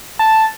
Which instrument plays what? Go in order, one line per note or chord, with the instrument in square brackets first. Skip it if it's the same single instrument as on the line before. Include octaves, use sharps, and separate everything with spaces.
[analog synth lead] A5